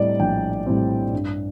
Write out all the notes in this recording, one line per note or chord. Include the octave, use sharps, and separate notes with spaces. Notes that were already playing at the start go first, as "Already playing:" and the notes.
Already playing: A2 G3 C4 D5 D#5
A#1 G5
A2 G3 C4
G2